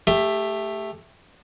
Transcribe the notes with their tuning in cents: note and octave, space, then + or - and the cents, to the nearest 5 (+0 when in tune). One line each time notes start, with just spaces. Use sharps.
A3 +0 G4 +25